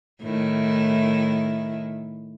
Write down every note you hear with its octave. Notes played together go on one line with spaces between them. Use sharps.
A2 D#3 E4